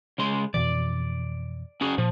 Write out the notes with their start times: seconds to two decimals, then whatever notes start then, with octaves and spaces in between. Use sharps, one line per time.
0.18 C#3 G#3 C6
0.54 F2 B2 E3 D5
1.81 C#4 F#4 G#4
1.98 A#2 F3